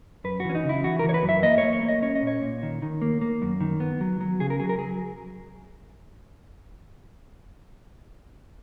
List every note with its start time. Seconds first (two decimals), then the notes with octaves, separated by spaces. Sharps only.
0.24 F#2 B4
0.40 E3 F#4
0.49 C#4
0.55 D#4
0.64 C#3
0.69 E4
0.84 E3 F#4
0.99 A#4
1.04 E3
1.09 C#5
1.14 B4
1.23 F#2
1.29 E5
1.43 A#3 D#5
1.58 C#5
1.63 A#3
1.73 C#5
1.83 A#3
1.88 D#5
2.02 C#4 C#5
2.15 D#5
2.22 A#2
2.27 C#5
2.42 A#2
2.63 D#3
2.82 D#3
3.02 A#3
3.21 A#3
3.42 F#2
3.61 D#3
3.80 B3
4.01 F#3
4.21 F#3
4.40 C#3 G#4
4.50 A#4
4.60 F#3 G#4
4.69 A#4
4.79 F#3 G#4